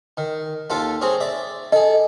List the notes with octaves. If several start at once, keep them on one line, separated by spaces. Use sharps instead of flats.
D#3
D#2 F4 A4
C4 G#4 C#5
D5 E5
G#4 A4 D#5